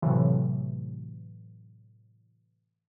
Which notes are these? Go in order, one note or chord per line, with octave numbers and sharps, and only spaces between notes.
A2 C3 E3 F#3